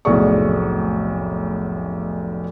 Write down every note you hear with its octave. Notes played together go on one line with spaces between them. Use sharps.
F1 B1 A2 G#4 D5 C#6